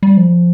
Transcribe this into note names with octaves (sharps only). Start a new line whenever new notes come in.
G3
F3